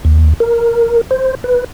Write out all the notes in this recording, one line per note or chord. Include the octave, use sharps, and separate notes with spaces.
D#2
A#4
C5
B4